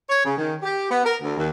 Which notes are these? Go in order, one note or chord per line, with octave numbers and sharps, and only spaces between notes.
C#5
C#3
D#3
G4
B3
A#4
D2
D#2